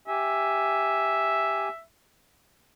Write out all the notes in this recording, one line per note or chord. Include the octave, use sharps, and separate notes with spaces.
G4 E5 G#5